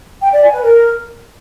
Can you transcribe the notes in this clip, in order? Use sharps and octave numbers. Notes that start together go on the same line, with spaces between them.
G5
D5
G#5
B4
A#4